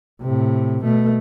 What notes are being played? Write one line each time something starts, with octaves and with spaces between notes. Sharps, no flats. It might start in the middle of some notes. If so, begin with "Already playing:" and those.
A2 C3
B2 A3